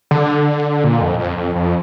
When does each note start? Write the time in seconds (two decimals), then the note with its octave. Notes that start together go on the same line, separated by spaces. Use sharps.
0.11 D3
0.84 A#2
1.01 F2
1.19 F2
1.38 F2
1.55 F2